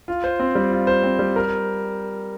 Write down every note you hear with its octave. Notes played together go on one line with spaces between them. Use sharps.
F4
C5
C4
G3
F4
C5
C4
G3
A#4